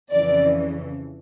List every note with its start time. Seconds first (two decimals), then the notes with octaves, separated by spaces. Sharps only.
0.12 F2 C#3 E3 D5